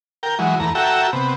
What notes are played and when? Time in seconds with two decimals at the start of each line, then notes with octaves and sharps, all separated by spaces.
0.23 A#4 G5
0.39 E3 F#3 G#3
0.60 E2 A3 A#5
0.75 F#4 A4 E5 G5 A#5
1.13 C3 B3